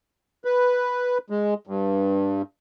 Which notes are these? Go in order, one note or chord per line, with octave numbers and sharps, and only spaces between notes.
B4
G#3
G2